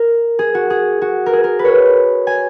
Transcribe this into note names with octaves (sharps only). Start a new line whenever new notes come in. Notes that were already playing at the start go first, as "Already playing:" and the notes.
Already playing: A#4
G#4
F#4
G#4
F#4
A#4
G#4
A#4
B4
C#5
G#5